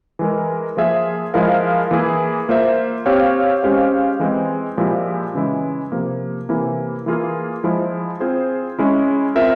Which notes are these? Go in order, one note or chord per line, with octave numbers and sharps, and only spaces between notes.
E3 G#3 E4 A#4
F3 A#3 F4 G#4 E5
F3 G#3 E4 A#4 F5
E3 A#3 E4 G#4
A#3 F4 C5 E5
C4 G4 C#5 F5
G#3 C#4 G4 C5 F5
E3 G#3 C4
A#2 F3 G#3 E4 G4
C#3 E3 G#3 E4
C3 F3 A#3
C3 E3 A#3 E4
E3 A#3 F4 G#4
F3 G#3 E4
C4 F4 G#4 C5
G#3 C#4 E4
C4 F4 A#4 E5